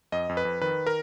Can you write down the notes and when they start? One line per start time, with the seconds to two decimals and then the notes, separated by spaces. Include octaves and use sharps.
0.12 F2 D#5
0.29 F2
0.37 B4
0.45 F2
0.62 D#3 B4
0.87 A#4